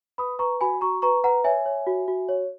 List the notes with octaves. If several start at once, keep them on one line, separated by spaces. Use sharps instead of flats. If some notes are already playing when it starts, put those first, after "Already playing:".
B4 B5 D#6
B4 A#5 C#6
F#4 G#5 B5
F#4 A#5 C#6
B4 A#5 C#6
B4 F#5 A#5
C#5 E5 G#5
C#5
F#4
F#4
C#5